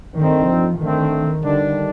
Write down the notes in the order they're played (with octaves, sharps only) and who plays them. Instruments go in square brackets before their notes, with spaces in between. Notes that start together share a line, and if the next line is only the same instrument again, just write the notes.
[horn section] G2 D3 A3 C4 D#4 [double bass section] D#3
[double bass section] F3
[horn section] D3 A3 C4 [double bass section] D#3
[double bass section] D3 [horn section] D#3 G3 D4